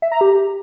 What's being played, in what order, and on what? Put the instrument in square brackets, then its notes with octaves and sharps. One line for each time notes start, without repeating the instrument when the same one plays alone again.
[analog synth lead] E5
A#5
G4